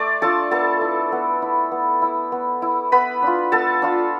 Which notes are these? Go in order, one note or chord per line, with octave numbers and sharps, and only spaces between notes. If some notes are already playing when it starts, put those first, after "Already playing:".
Already playing: A3 D5 C6 D6
D4 F4 A4 A5
B3 A4 A5
E4
B3
E4
B3
E4
B3
E4
B3 B4 B5
D4 F4
B3 A4 A5
D4 F4